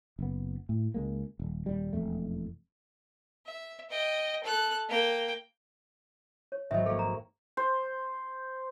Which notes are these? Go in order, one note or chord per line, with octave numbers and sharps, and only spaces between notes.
F#1 B3
A2
C#2 G#3 A#3
D#1
D#1 G3
E1 F2 A3
E5
D#5 G5
A4 F#6
A#3 G5
C#5
G#1 F#3 D#5 E5
A#3 A4 C#5 F5
A#5
C5